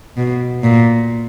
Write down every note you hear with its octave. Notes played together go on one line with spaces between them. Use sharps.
B2
A#2